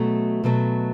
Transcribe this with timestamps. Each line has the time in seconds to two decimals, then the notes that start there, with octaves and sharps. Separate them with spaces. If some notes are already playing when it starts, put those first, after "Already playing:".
Already playing: B2 F#3 A3
0.44 B2 F#3 A3